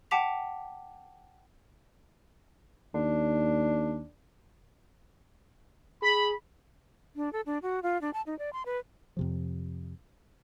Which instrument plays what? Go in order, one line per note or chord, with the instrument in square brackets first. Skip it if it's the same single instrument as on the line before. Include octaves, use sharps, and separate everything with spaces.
[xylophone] F#5 G5 A5 D6 B6 F7
[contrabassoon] D#2 [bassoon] D4
[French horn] G#4 [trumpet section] B5
[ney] D4
A4
D4
F#4
F4
D4
A5
D#4
D5
C6
B4
[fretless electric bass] F2 C3 F3